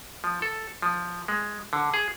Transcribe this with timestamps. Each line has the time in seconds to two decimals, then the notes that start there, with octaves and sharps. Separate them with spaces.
0.24 F3
0.42 A4
0.82 F3
1.28 G#3
1.73 D3
1.94 G#4